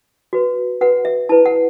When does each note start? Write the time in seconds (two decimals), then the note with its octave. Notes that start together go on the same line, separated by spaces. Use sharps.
0.33 F#4 B4
0.81 F#4 B4 F#5
1.05 E5
1.29 E4 B4 A5
1.46 F#5